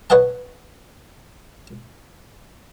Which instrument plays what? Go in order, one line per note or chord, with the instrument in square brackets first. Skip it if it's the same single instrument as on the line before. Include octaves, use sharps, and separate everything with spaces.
[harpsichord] B4 C#5 D#5 F#5 A5